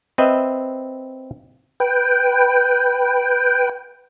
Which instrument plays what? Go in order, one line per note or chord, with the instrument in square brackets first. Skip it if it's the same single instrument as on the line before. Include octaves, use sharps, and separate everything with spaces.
[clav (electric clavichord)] C4 B4 D#5 E5
[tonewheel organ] B4 G5